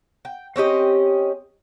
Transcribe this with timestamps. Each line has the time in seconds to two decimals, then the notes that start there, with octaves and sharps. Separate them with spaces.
0.25 G5
0.56 C4 C#4 G4 D#5